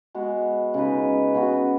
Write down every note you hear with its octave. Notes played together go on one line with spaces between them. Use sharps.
G#3 B3 F#4
C#3 G#3 D#4 B4
C#3 B3 F#4